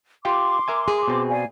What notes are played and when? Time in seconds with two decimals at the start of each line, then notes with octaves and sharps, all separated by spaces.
0.25 F4 G4 G5 C6 D6
0.68 A#4 E5 G#5
0.88 G#4
1.08 B2 C4
1.29 D5 F5 G#5